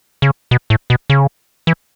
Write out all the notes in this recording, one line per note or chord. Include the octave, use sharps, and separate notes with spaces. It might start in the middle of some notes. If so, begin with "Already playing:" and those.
C#3
B2
A2
B2
C#3
E3